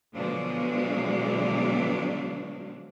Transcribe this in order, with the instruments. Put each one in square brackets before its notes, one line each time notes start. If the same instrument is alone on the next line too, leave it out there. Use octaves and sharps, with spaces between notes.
[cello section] B2 D3 F3 F#3 G#3 D4